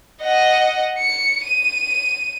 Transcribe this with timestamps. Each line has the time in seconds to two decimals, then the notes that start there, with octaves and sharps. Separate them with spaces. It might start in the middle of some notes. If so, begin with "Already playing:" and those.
0.22 D#5 F#5
0.99 C#7
1.45 D#7